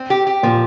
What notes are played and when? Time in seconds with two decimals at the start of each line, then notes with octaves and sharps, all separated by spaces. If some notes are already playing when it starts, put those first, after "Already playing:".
Already playing: C4
0.10 G4
0.27 G4
0.43 A#2 F3